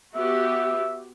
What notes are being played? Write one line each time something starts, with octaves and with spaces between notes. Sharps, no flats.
B3 F#4 G4 E5